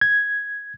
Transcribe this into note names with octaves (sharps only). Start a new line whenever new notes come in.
G#6